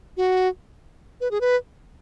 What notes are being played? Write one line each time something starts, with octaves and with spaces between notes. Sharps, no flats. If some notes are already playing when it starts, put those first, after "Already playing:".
F#4
B4
G#4
B4